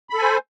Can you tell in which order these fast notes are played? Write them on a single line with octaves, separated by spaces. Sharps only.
B5 A4 G#5 C5